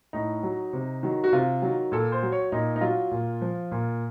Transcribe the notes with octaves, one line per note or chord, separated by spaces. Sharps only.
A2 D#4
F#3
C3
D#3 F#3
F#4
C3 F4
D#3 F#3
A#2 A4
C5
F#3
C#5
A#2 D#4
D#4
F#3 F4
A#2
F3
A#2